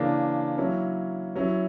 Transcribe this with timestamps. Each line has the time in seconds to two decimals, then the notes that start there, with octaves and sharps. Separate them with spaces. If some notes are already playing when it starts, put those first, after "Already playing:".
Already playing: C#3 E3 A#3 D4
0.57 F#3 A#3 C#4 E4
1.36 F#3 C#4 E4